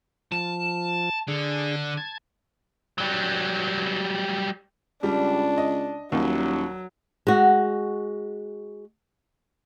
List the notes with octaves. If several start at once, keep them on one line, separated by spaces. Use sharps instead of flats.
F3 A5
D3 D4 G#4
A5 G#6
F#3 G3
C#2 G3 D4
D#5
D#1 D#2 F#3
G#3 F#4